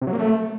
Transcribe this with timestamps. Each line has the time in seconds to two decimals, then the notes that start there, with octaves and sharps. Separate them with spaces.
0.01 C3
0.07 F#3
0.13 A#3
0.18 A3